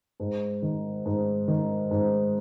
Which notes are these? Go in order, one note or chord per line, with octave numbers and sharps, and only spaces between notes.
G#2
D#3
G#2
D#3
G#2